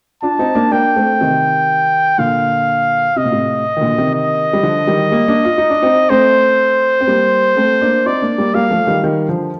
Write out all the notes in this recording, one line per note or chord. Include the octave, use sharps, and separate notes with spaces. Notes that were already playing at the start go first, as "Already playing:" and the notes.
D4 F4 A5
C4 D#4
A#3 D4
A#3 D4 G5
A3 C4
C3 D#3
A#2 D3 F5
C3 D#5
A#2
A2 C3
D#3
A#2 D3
C3 D#3
D#5
G3
D3 F3
D#3 G3
G3 A#3
A#3 D4
F4
D#4
D4
C4 D#4
A3 C4 C5
C4
G3 A#3
A3 C4
A#3 D4
C4 D#4 D5
A#3 D4
G3 A#3
G3 A#3 F5
F3 A3
D#3 G3
D#3 G3
D3 F3